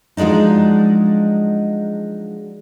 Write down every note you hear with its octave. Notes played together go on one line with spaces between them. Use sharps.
F3 F#3 G#3 D4 D#4